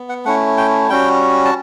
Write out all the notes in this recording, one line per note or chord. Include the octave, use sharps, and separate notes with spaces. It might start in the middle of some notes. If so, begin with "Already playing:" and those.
Already playing: B3
F#5
A3 C#4 E4 F#5
G5
G3 C#4 F#4 G5
A5